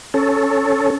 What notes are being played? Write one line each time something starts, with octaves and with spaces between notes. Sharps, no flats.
C#4 A4